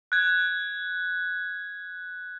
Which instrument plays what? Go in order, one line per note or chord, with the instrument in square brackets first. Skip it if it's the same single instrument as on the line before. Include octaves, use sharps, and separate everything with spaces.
[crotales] F#6 G#6